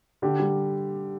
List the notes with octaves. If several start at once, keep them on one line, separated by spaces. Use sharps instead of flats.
D3 G4
G3